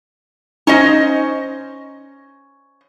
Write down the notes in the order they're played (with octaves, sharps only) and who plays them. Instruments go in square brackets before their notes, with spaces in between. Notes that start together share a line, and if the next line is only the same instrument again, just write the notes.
[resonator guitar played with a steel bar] C#4 C5 D#5 [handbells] D#4